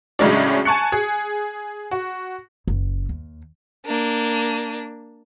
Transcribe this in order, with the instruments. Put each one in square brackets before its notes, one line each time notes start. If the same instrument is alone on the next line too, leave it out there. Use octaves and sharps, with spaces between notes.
[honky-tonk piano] A2 C#3 F#3 G#3 C#4 D4
G#5 A5 C#6 F#6 C#7
G#4
F#4
[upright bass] F#1
D#2
[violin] A#3 D4